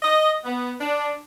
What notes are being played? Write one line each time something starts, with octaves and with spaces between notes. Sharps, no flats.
D#5
B3
D4